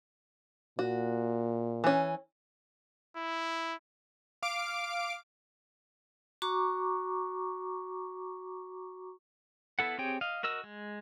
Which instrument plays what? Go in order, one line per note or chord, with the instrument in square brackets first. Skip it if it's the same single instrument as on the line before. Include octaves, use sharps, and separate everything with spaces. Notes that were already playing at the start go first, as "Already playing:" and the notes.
[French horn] A#2 [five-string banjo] F#4
[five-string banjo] E3 C#4
[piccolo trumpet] E4
[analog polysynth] F5 D6 D7
[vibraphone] F#4 A#5 C#6 D6
[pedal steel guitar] B3 E4 A4 F#5
C4 G4 G#4 C#5 G5
D#5 F5
F#4 A#4 D#5 E6
G#3